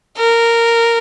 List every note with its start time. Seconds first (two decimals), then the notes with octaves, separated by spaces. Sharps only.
0.17 A#4